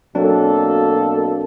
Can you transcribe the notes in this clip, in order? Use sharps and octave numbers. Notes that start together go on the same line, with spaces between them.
B2 F#3 A#3 C4 D4 A4